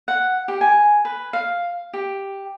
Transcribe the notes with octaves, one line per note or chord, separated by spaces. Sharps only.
F#5
G4
G#5
B4
F5
G4